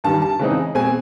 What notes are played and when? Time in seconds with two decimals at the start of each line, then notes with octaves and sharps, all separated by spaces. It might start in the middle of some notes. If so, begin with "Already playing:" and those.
0.04 G2 D#3 G3 A5
0.22 A5
0.40 C#3 E3 G#3 C4 D#4
0.75 B2 G#3 C4 G#5